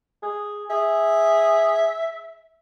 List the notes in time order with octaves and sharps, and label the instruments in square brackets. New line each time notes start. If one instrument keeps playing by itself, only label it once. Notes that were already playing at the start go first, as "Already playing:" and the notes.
[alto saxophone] G#4
[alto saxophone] G#4 [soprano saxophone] E5